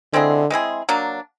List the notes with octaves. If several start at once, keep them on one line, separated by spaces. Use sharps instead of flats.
D3 G#3 C4 E4 G#4
G#3 C4 E4 G#4
F#3 A#3 D4